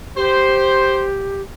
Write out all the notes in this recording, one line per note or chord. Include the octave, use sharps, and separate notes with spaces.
G4 C5